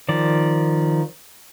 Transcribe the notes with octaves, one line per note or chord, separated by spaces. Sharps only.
D#3 F3 D5